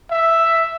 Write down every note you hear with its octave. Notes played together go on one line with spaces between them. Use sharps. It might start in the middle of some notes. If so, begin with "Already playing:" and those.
E5